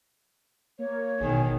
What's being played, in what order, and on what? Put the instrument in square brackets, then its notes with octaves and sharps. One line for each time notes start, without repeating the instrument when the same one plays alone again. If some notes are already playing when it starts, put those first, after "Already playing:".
[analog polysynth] A#3 [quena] C#5
[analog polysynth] A1 G#4 [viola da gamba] B2 D#3